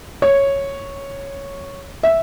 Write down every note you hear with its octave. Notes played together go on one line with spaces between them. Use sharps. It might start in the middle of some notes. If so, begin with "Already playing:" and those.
C#5
E5